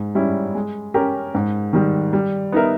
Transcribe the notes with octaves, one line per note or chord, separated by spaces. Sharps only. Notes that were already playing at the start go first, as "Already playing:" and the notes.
Already playing: G#2
G3 C#4 E4
G#3
C#4 G4 A#4
G#2
D#3 G3
G3
B3 D#4 A#4 E5